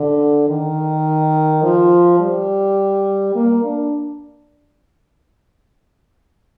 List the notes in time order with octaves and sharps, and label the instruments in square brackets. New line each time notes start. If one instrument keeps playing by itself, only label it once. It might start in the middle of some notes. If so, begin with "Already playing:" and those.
Already playing: [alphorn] D3
D#3
F3
G3
A#3
D4